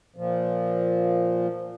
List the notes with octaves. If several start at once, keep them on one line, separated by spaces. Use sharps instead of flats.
A#2 F3